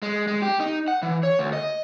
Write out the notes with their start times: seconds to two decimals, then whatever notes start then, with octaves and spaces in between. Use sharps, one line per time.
0.02 G#3
0.27 G#3
0.42 G4
0.60 D#4
0.88 F#5
1.02 E3
1.23 C#5
1.39 D2
1.53 D#5